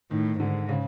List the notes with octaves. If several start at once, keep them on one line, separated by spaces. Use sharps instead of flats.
A2 D#3
G#2 D3
C#3